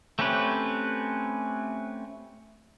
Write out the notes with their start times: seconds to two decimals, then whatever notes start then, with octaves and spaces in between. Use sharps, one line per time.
0.19 A3 C4 C#4 G4 B4